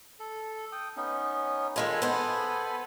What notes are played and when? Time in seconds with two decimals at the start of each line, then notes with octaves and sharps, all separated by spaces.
0.20 A4
0.72 G5 D#6
0.97 B3 C#4 D#4
1.76 D#3 G#3 F4 A4 G#5 B5
2.02 B3 C5